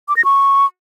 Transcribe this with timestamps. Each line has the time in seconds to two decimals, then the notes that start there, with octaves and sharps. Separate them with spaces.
0.08 D6
0.16 A#6
0.25 C#6